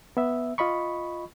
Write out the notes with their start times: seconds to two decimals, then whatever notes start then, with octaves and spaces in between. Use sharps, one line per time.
0.17 B3 E5
0.58 F4 D#5 B5 C#6